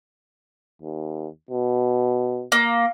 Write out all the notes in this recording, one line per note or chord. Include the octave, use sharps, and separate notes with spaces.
D#2
B2
A#3